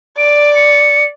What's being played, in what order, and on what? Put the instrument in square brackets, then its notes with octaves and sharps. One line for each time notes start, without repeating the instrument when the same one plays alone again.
[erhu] D5 [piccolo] D7
[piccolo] C#7